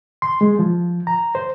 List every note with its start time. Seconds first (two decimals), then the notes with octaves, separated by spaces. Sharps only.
0.22 C6
0.41 G#3
0.59 F3
1.07 A#5
1.35 C5